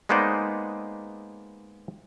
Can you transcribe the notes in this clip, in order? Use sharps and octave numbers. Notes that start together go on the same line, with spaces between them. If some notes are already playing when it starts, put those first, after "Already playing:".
G#3 A#3 B3 D#4 C5 D5